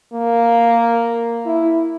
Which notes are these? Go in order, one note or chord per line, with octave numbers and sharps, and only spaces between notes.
A#3
E4